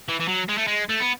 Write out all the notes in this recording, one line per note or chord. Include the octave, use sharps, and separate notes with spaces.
E3
E3
F#3
G#3
A3
G#3
A3
B3